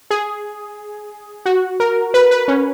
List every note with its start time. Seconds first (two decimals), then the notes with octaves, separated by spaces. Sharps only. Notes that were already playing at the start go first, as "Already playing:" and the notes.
0.10 G#4
1.46 F#4
1.80 A#4
2.14 B4
2.31 B4
2.48 C#4